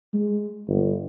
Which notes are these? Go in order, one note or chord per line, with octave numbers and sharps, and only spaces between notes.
G#3
G1